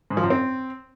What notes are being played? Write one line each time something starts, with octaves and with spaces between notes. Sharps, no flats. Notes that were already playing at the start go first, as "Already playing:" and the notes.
G#2
F3
F#2
C4